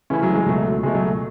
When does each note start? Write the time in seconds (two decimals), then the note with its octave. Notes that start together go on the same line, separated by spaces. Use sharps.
0.10 C#3 E3 A3 C#4 E4
0.23 F#3
0.35 G#3
0.46 C#2 B2 F#3 A3
0.83 C#2 B2 G#3 A3
0.94 F#3